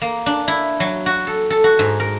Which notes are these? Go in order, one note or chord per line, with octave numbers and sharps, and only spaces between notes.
A#3
D4
E4
F#3
F#4
A4
A4
F#4
G#2
A#4